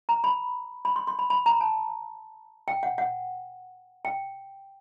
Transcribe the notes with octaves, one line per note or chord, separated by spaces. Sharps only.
A#5
B5
B5
C6
C6
B5
B5
A#5
A5
G5
F#5
F#5
G5